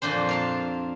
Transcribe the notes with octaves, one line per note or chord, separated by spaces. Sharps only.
F2 A#2 D4 C5
A#4 F5 A5